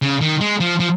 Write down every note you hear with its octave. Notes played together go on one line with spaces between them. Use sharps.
C#3
D#3
G#3
F3
F3